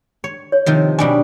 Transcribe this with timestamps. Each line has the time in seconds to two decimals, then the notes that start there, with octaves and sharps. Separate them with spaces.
0.24 C#5
0.52 C#5
0.66 C3 D#3 F3
0.99 B2 G3 D4 G#5